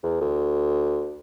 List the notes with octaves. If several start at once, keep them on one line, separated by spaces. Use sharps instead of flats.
E2
D2